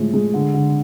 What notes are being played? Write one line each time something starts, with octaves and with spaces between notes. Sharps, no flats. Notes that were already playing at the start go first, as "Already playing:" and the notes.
Already playing: A2 F3 G#3
G#3
D3
D3